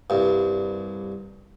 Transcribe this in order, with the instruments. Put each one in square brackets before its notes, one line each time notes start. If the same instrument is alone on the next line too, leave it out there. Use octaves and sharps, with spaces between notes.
[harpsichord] C2 G2